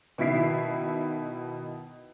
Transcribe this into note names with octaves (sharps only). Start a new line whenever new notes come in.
B2 D#3 E4 E5 B6 C7